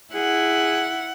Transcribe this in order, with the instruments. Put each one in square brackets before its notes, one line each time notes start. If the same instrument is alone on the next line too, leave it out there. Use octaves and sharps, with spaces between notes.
[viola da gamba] E4 [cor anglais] G#4 [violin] F#5